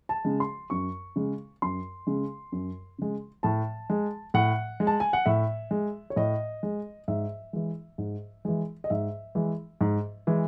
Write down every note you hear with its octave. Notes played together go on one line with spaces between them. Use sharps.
A5
C#3 G#3
C6
F#2 C#6
C#3 G#3
F#2 C6
C#3 G#3
F#2
C#3 G#3
A2 A5
G#3
A2 F#5
G#3
A5
G#5
F#5
A2 E5
G#3
C#5
A2 D#5
G#3
G#2 E5
E3 G#3
G#2
E3 G#3
D#5
G#2 E5
E3 G#3
G#2
E3 G#3